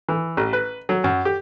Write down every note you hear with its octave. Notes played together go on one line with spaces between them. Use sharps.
E3
A1
B4
F#3
F#2
G4